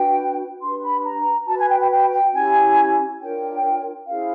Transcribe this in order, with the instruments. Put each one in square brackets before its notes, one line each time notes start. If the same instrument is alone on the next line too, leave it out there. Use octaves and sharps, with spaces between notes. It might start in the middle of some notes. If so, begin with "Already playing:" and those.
Already playing: [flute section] D4 F#4 B4 G5
D4 G4 B4 C6
B5
A#5
F#4 A5
B4
G#5
G5
G5
G5
G5
C#4 E4 G4 G#5
D4 F4 A#4 C#5 G5
C#4 E4 G#4 C5 F5